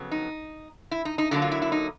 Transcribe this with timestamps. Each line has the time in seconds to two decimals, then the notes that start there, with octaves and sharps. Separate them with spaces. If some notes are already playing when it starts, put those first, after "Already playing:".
Already playing: F2 C#3 F#3 B3
0.11 D#4
0.91 E4
1.05 D#4
1.18 D#4
1.31 D3 F#3 A#3 D4 E4
1.42 F4
1.51 E4
1.62 E4
1.72 D#4